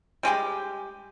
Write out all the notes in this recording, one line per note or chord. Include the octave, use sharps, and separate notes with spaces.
G3 G#3 G4 G#4